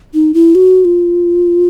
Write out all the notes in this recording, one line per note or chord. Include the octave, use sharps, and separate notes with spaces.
D#4
E4
F#4
F4